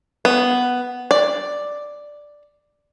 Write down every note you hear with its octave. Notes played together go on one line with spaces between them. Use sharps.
B3
D5